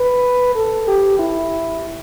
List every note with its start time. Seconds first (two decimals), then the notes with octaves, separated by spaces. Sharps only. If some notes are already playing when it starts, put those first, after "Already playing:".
Already playing: B4
0.55 A4
0.87 G4
1.19 E4